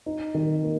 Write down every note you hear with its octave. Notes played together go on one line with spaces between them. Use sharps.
D#4
D#3
A#3